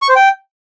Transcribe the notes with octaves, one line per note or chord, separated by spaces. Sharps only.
C#6
C5
G5